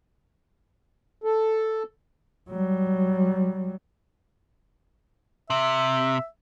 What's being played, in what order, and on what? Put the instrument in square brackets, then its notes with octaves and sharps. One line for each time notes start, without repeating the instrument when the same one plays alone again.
[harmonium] A4
[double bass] F#3 G3
[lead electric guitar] C3 [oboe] E5